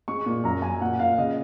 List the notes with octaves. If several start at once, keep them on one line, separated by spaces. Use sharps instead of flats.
G#3 C#6
A#2
F#2 A#5
F#2 G#5
A#2 F#5
A#2 F5
C#3 D#5